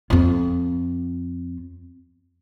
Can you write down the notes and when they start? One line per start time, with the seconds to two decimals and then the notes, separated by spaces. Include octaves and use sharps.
0.10 F2 F4